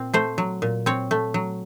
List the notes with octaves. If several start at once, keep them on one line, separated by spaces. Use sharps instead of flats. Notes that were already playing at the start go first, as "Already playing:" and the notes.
Already playing: A#2 C4
A3 C5
F#3
A#2
C4 C#5
A3
F#3